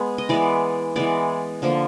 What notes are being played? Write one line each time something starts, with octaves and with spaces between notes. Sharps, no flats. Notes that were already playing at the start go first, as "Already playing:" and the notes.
Already playing: G#3 B3
D#5
E3 G#3 B3 D5
E3 G#3 B3 D5
D3 F3 A#3